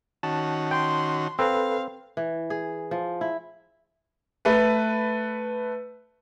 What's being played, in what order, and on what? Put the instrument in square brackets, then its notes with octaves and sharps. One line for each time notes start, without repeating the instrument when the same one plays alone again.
[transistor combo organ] D#3 C#4 F#4 [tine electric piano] A5
[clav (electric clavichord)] G5 [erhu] C6
[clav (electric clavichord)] C4 [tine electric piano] A4 B4 [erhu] F5
[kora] E3
G#4
F3
E4
[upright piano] A3 B4